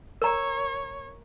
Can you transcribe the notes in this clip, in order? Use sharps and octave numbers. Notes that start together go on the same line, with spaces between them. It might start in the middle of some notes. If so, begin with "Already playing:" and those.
A#4 C#5 A#5